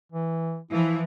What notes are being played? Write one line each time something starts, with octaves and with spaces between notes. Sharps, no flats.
E3
E3 F3 E4